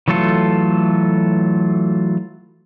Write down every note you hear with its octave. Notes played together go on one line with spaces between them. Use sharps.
E3 F#3 A3 F4 A4